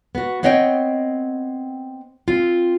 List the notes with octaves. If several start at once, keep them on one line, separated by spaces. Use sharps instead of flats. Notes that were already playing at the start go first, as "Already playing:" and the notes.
B3 F#4
B3 C4 C#5 D#5 F5 G5
C4 F4